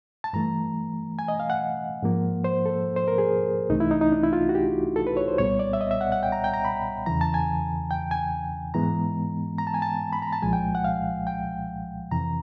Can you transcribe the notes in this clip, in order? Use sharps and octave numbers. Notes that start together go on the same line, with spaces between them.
A5
G2 E3 A3 A#5
G#5
D#5
F5
F#5
G#2 F3 A#3
C5
A4
C5
A#4
G#4
C2 C3 E3 A3 D#4
E4
D#4
D#4
D4
E4
F4
F#4
G4
A4
B4
C#5
C5
C2 A#2 G3 B3 C#5
D5
E5
D#5
E5
F#5
F#5
G5
A#5
G5
A#5
B5
E2 C#3 E3 A#5
A5
G#5
G5
G#5
G#2 E3 G#3 B3 A#5
A#5
A5
G#5
A5
B5
A#5
A5
C2 A#2 F3 G#3 G#5
G5
F#5
F5
G5
F2 C3 E3 A#5